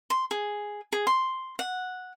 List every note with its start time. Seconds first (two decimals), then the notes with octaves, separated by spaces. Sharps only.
0.10 C6
0.31 G#4
0.92 G#4
1.07 C6
1.59 F#5